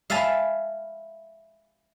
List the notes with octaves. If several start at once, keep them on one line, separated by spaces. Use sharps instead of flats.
E5 F5 G#5 A5 B5